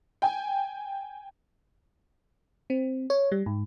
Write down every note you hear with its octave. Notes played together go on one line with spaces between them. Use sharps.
G5 G#5
C4
C#5
G3
G#2